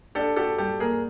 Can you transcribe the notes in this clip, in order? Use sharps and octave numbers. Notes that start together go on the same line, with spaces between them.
D4 G4 A4
F#4 G4 A4
G3 G4 A4
A#3 G#4 A#4